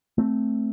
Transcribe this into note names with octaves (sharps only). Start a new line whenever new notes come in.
A3 C4